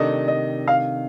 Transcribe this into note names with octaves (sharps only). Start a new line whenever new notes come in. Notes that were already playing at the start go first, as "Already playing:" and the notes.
Already playing: C3 D#3 A3 D4 D#5
D#5
F5